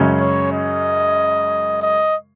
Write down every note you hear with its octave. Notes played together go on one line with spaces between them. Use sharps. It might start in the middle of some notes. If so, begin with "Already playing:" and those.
Already playing: F#2 C#3 G#3 C#4
C#5
D#5
D#5